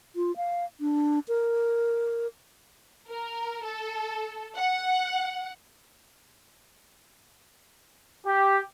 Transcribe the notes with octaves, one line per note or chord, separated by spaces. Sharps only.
F4
F5
D4
A#4
A#4
A4
F#5
G4